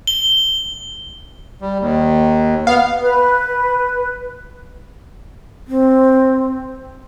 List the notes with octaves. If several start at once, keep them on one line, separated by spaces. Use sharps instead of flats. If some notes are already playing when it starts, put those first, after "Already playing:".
G7
G3
D#2
B3 F5
B4
C4